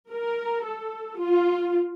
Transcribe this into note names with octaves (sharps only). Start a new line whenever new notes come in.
A#4
A4
F4